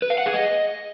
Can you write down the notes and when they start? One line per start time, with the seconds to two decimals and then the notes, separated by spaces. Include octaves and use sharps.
0.02 B4
0.10 F5
0.18 F#5
0.26 G#4
0.34 D#5